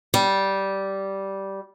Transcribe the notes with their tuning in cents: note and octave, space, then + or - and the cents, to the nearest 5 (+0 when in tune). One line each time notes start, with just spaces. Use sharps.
G3 -10